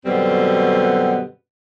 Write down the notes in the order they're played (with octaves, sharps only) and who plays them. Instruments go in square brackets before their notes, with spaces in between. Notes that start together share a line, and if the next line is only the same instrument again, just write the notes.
[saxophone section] F#2 B2 D3 G3 B3 C4